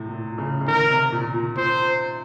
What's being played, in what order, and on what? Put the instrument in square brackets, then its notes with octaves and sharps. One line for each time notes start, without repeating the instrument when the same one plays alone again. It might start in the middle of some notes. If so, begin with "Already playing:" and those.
Already playing: [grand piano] A2 C3
A#2
C#3
C#3
[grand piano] D#3 [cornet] A#4
[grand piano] C3
A#2
A#2
[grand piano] A#2 [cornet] C5